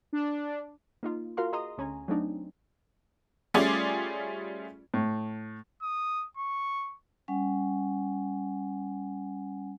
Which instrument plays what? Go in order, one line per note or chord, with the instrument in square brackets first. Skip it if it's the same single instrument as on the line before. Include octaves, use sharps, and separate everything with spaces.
[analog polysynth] D4
[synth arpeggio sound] A#3 D#4 F4
F4 F#4 A#4 F5 C6
G#4 D#5 A#5 C6 D#6
D2 C#4 G#5 A#5
F#3 A3 C4 D4 D#4
[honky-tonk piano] G3 A3 C#4 F4 G#4 D5
[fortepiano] A2
[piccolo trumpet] D#6
C#6
[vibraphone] G3 C#4 F#5 G#5